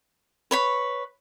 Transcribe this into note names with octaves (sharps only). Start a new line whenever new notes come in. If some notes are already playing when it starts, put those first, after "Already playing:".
B4 C#5 B5